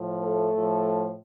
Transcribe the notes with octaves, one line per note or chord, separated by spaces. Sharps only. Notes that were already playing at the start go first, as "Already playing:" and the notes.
Already playing: A2 F3
A3 A4
A2 F3